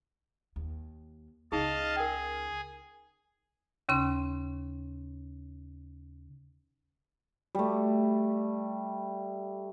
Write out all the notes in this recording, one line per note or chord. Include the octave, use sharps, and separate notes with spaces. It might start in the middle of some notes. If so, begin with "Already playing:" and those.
D#2
C#2 C#3 D#4 G#4 D#5 F5 A5
G#4 A#4 G5
D#2 C#3 C#4 C6
G3 A3